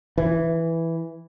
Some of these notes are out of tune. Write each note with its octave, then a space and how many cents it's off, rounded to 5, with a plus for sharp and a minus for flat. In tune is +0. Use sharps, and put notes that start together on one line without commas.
E3 +0